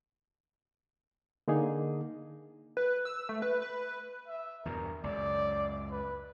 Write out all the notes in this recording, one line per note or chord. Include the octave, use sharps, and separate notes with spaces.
D3 A#3 D#4 G#4
B4
E6
A3
B4
B4
E5
E2 G2 B2 A#4
C#2 F#2 D5
B4